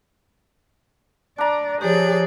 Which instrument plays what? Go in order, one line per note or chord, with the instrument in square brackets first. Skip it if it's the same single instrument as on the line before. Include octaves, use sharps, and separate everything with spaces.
[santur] D4 A#5 [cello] D5
[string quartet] F3 D5 [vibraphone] G4 C#5 [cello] G#4